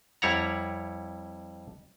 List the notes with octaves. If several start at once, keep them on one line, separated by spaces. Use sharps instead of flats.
F2 G3 E4 C#5 F#5 A#5